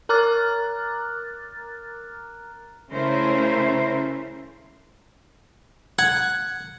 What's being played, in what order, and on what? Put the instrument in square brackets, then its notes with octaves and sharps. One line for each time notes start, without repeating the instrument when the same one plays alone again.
[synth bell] A#4 A#5 D6 F6 F#6 A6
[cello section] C#3 A3 C#4 E4 A#4 C5
[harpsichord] F#5 [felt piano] G#6